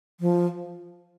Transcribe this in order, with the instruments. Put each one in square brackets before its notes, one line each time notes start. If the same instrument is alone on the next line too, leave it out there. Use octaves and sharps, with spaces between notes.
[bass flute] F3